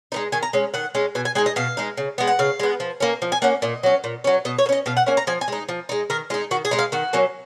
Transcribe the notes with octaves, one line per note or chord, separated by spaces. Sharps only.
G#3 B3 D#4
D#3 G#5
A#5
G#3 C#4
D#3 F#5
G#3 C#4
B2 G#5
G#5
G#3 D#4 G#5
D#5
B2 F5
G#3 D#4
C#3
G#3 B3
F#5
C#3 F5
G#3 B3
F3
A#3 C#4
F3
G#5
A#3 C#4 F#5
A#2 D#5
F#3 C#4
A#2
F#3 C#4
B2 D#5
C#5
A#3
C#4 D#5
B2 F5
F#5
A#3 C#4 G#5
A#5
F3 G#5
G#5
G#3 D#4
F3
G#3 D#4
D#3 A#4
G#3 D#4 F4
D#3 F#4
G#4
G#3 D#4
F5
D#3 F#4
F#3 A#3 C#4